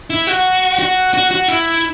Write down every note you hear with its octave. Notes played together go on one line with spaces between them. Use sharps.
E4
F#4
F#4
F#4
F#4
E4